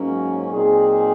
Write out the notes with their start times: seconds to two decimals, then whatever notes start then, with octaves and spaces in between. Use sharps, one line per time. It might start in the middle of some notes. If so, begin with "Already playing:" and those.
Already playing: G#2 F#3 A#3 C#4
0.51 A#2 F#3 C4 D#4 G#4